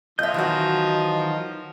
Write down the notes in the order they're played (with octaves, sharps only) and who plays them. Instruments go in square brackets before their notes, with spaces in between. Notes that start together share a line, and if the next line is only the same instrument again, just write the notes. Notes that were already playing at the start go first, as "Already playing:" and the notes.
[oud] F2 E5 [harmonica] F3 [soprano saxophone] D#5 [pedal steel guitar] G6
[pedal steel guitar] D#3 F#3 [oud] E3 B3 F#4